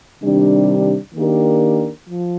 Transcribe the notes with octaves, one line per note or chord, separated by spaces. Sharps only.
C3 D#3 G3 D4
D#3 A#3 D4 G4 A#4
F3